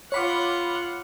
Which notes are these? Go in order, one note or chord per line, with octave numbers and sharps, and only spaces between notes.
F4 C#5 F#5 B5 D6